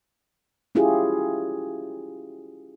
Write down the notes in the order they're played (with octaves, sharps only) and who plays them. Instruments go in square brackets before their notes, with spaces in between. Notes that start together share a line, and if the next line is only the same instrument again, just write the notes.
[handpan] C#4 E4 F4 G4 G#4